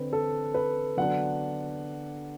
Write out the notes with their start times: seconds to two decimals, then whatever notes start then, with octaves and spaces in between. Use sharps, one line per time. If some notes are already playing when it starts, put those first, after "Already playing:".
Already playing: D3 C4 B4
0.13 A4
0.54 B4
0.97 D3 F#3 B3 D4 F#5